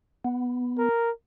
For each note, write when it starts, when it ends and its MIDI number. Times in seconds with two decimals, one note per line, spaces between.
0.25 0.89 59
0.78 1.11 70